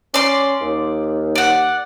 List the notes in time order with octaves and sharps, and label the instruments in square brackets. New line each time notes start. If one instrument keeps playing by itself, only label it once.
[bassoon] C#4 [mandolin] D5 C6
[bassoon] D#2
[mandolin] D5 F#5